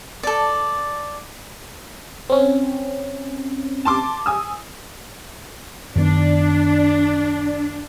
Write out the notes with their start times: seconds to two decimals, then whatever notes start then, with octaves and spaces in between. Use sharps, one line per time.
0.23 A4 D5
2.30 C4 C#4
3.85 A5 C6 D6
4.26 G#5 D#6 E6
5.95 F#2 D#3 B3 D4